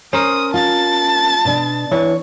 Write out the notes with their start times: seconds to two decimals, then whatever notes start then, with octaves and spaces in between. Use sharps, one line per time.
0.13 C#4 A#4 C5 D#6
0.54 F4 A5 A6
1.45 B2 D4
1.92 E3 C#5